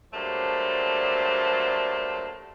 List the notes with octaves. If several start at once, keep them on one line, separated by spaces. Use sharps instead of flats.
F#3 G3 A3 A#3 D4 C5